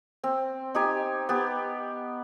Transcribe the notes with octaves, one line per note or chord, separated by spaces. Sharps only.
C4
D#4 G4 G#5
B3 G4